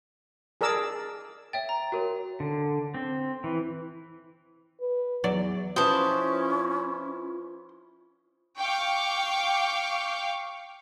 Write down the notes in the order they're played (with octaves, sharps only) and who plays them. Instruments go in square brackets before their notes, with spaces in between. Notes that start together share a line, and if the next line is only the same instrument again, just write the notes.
[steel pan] G#4 A#4 D5 A5 E6
[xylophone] C#5 E5 G5 [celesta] A6
[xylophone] A#5
[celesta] F#4 A#4 C#5
[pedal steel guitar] D3
C4
E3
[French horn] B4
[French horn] E2 [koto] F#3 D5
[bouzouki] F3 E4 B4 [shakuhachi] C#4 [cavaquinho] C5 A5 [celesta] D#6
[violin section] F5 G5 C#6 D6